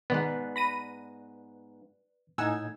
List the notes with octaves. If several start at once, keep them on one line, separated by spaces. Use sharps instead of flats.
G#2 B2 D#3 G#3 B3 B4 D5 F#6
B5 A#6 D#7
A2 D#4 F#5 G#5 E6 G#6